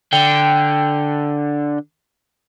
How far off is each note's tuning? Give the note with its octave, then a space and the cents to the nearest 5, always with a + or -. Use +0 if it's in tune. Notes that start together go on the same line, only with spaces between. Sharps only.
D3 +0 G5 +0